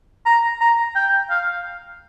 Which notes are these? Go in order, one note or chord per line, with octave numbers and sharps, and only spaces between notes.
A#5
A#5
G5
F5